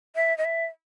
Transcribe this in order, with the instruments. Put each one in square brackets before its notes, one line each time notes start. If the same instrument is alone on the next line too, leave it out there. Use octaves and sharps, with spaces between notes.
[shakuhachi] E5
D#5
E5